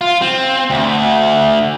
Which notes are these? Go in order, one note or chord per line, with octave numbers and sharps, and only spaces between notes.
F4
C4
D2